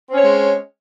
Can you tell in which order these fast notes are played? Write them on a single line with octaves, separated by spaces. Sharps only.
C4 C#4 C#5 G#3